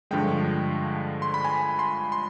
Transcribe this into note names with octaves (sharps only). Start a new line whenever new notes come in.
G2 D3 F3 G#3 G5
C6
B5
G#5
C6
C6